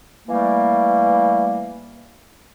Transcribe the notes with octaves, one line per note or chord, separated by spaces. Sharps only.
E3 G3 A3 A#3